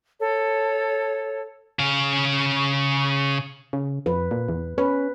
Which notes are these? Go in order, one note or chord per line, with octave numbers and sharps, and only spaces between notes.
A4 C#5
C#3 F5
C#3
F2 B4
A#2
E2
C#4 B4